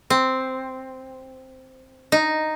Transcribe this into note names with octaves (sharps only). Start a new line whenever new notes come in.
C4
D#4